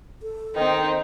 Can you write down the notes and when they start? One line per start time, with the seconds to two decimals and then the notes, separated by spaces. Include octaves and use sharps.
0.23 A4
0.56 D#3 C4 D#4